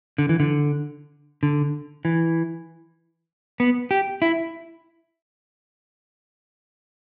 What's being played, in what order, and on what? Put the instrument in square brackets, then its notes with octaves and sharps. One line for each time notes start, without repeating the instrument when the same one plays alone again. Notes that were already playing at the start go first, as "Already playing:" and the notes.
[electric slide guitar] D3
E3
D3
D3
E3
B3
G4
E4